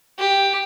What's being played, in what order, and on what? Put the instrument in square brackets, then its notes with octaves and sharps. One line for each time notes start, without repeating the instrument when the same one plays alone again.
[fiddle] G4